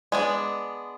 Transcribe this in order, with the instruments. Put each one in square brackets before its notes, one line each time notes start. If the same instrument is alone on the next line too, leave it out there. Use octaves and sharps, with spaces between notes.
[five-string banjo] G#3 B3 D4